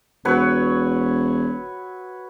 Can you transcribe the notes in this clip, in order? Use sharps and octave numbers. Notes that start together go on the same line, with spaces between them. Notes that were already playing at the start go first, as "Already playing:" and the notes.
E1 F#3 B4 C#5